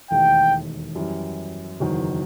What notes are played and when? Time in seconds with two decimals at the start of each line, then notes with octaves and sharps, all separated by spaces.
0.10 E1 D#2 D#3 A3 E4 G5
0.96 F#2 E3 G3
1.80 F#1 E2 D#3 F#3